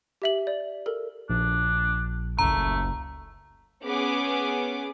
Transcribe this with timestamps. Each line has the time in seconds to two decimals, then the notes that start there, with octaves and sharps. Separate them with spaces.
0.22 G4 E5 F#7
0.47 D5
0.86 A4 A#4
1.30 A#1 D4
2.39 F#1 C#2 A3 A#5
3.86 B3 C#4 G#4 D6